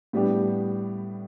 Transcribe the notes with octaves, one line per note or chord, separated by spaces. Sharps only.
A2 G3 B3 D4 G4